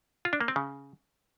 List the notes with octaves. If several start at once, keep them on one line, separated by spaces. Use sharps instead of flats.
F4
D4
A#3
C4
C#3